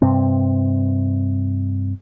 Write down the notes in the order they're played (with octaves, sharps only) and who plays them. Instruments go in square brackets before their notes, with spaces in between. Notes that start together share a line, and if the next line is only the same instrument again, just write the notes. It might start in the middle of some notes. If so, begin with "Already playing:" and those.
[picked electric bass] G2 C3 C4